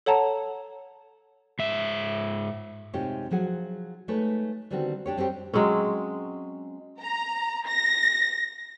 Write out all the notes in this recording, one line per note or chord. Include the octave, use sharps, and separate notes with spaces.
A4 C#5 F#5 A5 A#5
G#2 E5
C3 G#3 D#4 F4 G4 C#5
F3 F#3 G#4 F#5
G#3 A3 D#4 B4 C#5
D3 D#3 G3 B3 C4 F#4
D4 G4 C#5
G3 C4 D4 G4 C#5
F#3 G#3 C4 C#4
A#5
A#6